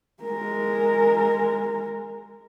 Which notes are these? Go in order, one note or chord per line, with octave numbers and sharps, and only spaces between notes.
G#3 A#4